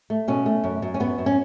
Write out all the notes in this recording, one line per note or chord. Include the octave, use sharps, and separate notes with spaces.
A3
B2 C#4
A3
F#2
F#2
C#4
F#2 B3
F#2
C#4